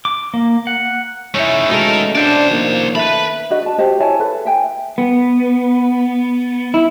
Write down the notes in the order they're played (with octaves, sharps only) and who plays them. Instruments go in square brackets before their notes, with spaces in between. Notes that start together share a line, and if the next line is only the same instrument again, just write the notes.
[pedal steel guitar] D6
A#3
F#5
[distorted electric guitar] A3 D#4 [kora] C#4 E4
[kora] B2 A4 F5 [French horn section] G#3 A3 [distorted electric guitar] D#4 A#4
[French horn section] D4 [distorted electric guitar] C5 D5 [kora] F#5
[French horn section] D#3 F3 A#3
[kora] A3 [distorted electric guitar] B4 B5
[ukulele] D4 F#4 D#5
D5 A5
F#4 G4 C5 D#5
E4 C#5 G#5 A5
A4 B4
E5 G5 G#5
[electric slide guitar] B3
E4